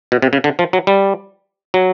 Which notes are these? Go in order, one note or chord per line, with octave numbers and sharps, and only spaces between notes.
B2
C3
C#3
D3
F3
F#3
G3
F#3